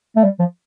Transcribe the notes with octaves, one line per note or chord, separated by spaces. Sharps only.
A3
G3
F3